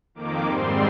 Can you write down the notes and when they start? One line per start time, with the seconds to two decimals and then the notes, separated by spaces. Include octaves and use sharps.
0.15 F2 D#3 A#3 D6
0.45 G#2 G3 C4 C6